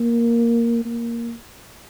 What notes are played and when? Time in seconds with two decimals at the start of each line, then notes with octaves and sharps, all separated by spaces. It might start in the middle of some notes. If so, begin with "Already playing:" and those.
Already playing: A#3
0.85 A#3